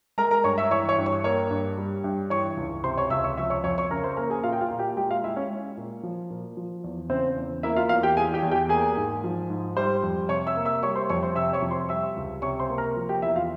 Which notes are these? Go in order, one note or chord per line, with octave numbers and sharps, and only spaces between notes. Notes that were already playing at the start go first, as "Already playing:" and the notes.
G#3 A#4 A#5
A#4 A#5
G2 C#5 C#6
E5 E6
E3 C#5 C#6
C#5 C#6
G2
C#5 C#6
A#3 C#5 C#6
G2
G3
G2
E3 C#5 C#6
C#2
C3 C5 C6
C#5 C#6
C#2 E5 E6
C#5 C#6
F3 E5 E6
C#5 C#6
F2 C#5 C#6
C#5 C#6
C#3 A#4 A#5
C5 C6
A#3 A#4 A#5
G#4 G#5
A#2 F4 F5
G5
F4 F5
A#2
G4 G5
G#3 G4 G5
F4 F5
G#3 E4 E5
C#4 C#5
G#3
A#2
F3
A#2
F3
E2
C#3 C4 C5
E2
A#3 E4 E5
F4 F5
E2 F4 F5
G4 G5
E3 G#4 G#5
G4 G5
E2
G4 G5
A#3 G#4 G#5
G#2
F3
G#2
G3 C5 C6
F2
C3 C#5 C#6
E5 E6
A#3
E5 E6
G3 C#5 C#6
C5 C6
F2 C#5 C#6
C5 C6
C3 E5 E6
C#5 C#6
F2
C5 C6
G3 E5 E6
C#2
C3 C#5 C#6
C5 C6
A#3
A#4 A#5
F3
G4 G5
E2 E4 E5
F4 F5